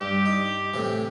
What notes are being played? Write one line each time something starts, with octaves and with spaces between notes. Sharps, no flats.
G2 G4
D#4
A2 C3 E3